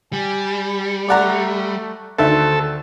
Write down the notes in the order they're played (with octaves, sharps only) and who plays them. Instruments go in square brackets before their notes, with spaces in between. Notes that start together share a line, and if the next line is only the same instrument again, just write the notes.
[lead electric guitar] G3 [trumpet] G#5
[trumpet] A3 [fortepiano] D5 F#5 A#5
[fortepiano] D2 D#3 E5 [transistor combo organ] A4 [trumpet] C5